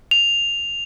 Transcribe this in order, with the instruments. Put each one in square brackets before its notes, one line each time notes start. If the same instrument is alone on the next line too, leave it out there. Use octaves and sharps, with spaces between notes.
[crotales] F7